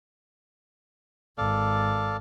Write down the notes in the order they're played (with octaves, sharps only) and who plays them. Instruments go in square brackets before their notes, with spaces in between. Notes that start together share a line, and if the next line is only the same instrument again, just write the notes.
[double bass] G#1 [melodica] A4 D5 F5